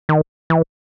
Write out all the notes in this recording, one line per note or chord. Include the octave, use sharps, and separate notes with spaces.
D#3
E3